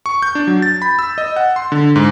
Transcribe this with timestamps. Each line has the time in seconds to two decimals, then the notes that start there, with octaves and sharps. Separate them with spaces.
0.06 C#6
0.22 G6
0.35 D4
0.47 F#3
0.62 A6
0.82 B5
0.99 E6
1.18 D#5
1.36 F#5
1.56 C6
1.72 D3
1.96 G#2